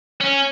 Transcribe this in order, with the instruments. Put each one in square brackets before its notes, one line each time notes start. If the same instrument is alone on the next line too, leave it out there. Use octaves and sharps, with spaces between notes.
[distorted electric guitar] C#4